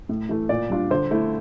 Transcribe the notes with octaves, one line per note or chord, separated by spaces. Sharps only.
A2
E3 A3
A#2 D5
G3 D4 F4
D3 C5
A3 E4